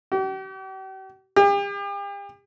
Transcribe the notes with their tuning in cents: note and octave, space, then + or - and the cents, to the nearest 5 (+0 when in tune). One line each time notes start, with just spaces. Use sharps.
G4 -45
G4 +40